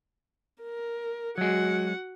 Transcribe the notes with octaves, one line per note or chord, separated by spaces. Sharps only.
A#4
F#3 G#3 F#4 F#5